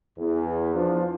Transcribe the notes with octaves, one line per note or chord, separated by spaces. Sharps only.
E2
F3 D4 F4